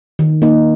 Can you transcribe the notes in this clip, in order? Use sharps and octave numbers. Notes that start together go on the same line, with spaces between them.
D#3
A#3 D#4